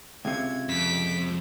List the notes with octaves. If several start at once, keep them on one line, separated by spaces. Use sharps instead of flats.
C#2 C3 G#6
F2 D6 B6